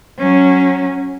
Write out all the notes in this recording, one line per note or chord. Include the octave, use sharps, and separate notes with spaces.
F#3 C#4